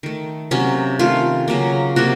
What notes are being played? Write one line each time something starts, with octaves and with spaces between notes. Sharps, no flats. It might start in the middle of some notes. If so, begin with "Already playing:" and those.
D#3 A3
C3 F#3 A#3 C#4
D#3 A3 F4
C#3 F#3 A#3
C3 F3 A#3 F#4